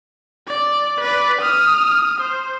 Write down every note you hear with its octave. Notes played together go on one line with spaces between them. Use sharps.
D5
B4 D5
D#6 F6
C5